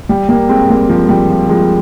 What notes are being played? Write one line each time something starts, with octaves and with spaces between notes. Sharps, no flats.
G3
G3 A#3
G#3 C4
G3 A#3
F3 G#3
G3
F3
F3 G#3